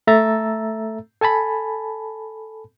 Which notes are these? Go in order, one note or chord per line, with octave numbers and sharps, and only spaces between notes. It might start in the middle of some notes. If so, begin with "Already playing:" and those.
A3 A4 E5 A#5 E6 A6
A4 G#5 A5 B5